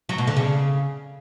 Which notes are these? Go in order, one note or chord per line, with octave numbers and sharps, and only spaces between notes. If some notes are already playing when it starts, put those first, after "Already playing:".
F#3
B2
D3
C#3